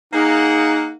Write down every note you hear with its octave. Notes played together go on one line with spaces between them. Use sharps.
A#3 D#4 G#4 F#5